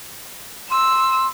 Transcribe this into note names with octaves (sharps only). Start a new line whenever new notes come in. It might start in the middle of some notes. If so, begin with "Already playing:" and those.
C6 E6